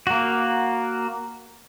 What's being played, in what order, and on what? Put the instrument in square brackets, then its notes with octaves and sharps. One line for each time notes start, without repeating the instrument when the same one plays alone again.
[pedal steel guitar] A#3 F#4